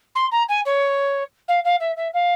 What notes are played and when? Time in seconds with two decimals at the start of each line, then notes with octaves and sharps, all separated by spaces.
0.15 C6
0.31 A#5
0.48 G#5
0.65 C#5
1.48 F5
1.64 F5
1.80 E5
1.96 E5
2.13 F5